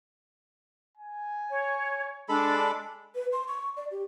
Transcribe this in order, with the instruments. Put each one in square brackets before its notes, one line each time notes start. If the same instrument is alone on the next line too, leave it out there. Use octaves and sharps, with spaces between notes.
[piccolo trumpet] G#5
[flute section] C#5
[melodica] G#3 A4 B5 [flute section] D4
[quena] B4
C6
C#6
D5
G4